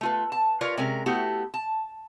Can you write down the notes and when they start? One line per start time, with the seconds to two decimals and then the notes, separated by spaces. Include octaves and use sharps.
0.01 A3 F4 B4
0.32 A5
0.61 F4 A#4 B4 C#5 D5
0.77 C3 G#3 C#4 A#4
1.06 A3 B3 E4 F#4 G4
1.54 A5